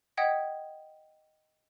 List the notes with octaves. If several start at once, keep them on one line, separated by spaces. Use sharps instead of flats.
D#5 F#5 G5 D#6 G#6 B6